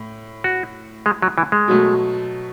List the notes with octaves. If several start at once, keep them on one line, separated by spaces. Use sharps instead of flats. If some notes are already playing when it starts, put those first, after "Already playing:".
Already playing: A2
F#4
G#3
F#3
E3
G#3
B2 F#3 A3